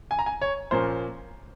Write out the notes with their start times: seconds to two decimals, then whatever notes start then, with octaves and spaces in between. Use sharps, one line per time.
0.11 G#5
0.19 A#5
0.26 G#5
0.41 C#5
0.71 A#2 F3 A#3 C#4 C5